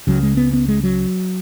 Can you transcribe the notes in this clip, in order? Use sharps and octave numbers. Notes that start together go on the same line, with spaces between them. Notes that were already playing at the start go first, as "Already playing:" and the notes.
C#2 C#3 F#3
G#3
B3
B3
G#3
F#3